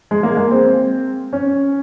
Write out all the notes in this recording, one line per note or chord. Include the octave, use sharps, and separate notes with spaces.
G#3
A#3
G#3
C4
C#4